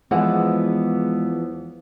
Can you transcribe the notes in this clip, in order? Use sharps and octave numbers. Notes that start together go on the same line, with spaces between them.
E2 E3 F3 G#3 B3 E4 F#5 G#5